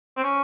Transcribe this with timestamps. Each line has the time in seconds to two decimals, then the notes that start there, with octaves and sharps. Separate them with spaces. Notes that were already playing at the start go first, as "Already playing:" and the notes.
0.17 C4
0.24 C#4